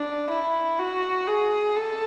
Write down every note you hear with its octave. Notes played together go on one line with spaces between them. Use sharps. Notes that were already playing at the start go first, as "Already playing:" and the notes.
Already playing: D4
E4
F#4
G#4
A4